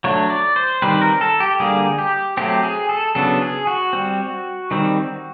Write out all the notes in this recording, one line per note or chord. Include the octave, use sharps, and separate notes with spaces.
F#3 A3 D4 C#5
D5
C5
D#3 G3 C4 B4
A#4
A4
G4
D3 G3 A#3 G#4
G4
F#3 A3 C4 G4
G#4
A4
C#3 F#3 B3 D4 A4
G#4
F#4
G3 C4
D#3 G3 C4